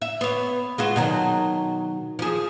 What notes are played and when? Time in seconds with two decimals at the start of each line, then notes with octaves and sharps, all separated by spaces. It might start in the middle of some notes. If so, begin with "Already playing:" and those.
0.02 E5
0.21 B3 C#5
0.78 G#3 F4 F#4
0.96 B2 D#3 F#3
2.19 F3 G#4